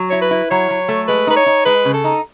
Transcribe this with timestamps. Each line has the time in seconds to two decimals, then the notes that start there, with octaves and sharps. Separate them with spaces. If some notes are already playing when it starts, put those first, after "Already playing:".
Already playing: F#3
0.10 E4 C#5
0.22 B4
0.31 E4
0.50 F#3 C#5
0.70 F#3
0.88 A3
1.08 G#3 B4
1.27 D#4 B4
1.37 C#5
1.46 D#4
1.65 G#3 B4
1.85 C#3
1.94 A4
2.04 D#4